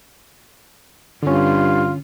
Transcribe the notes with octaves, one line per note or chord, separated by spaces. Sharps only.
G2 D3 C#4 F4